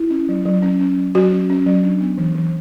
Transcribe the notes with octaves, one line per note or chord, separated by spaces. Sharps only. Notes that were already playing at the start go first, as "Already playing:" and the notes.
Already playing: E4
C#4
F#3
F#3
C#4
C#4
F#3
F#3 F#4
C#4
C#4
F#3
D4
B3
E3
E3